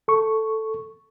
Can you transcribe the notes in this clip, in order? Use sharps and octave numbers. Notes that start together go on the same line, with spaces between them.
A4 C#6